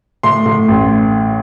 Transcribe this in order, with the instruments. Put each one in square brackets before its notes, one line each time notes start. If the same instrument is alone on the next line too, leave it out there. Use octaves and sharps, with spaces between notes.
[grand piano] A2 C6
A2
A1